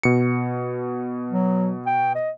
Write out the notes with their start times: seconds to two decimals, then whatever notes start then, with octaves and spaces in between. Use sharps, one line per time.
0.03 B2 C#7
1.32 F#3
1.87 G5
2.15 D#5